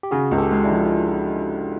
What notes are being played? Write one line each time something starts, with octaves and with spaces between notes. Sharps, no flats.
G4
C#3 F#4 G#4
C#2
G4 A4
G#3
D4 E4
F3